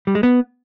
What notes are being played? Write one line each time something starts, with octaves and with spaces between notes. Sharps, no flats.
G3
G#3
B3